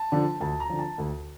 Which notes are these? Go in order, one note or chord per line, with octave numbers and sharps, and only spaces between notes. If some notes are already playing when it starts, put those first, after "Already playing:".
Already playing: A5
D3 F3
D2 A5
A#5
D3 F3
A5
D2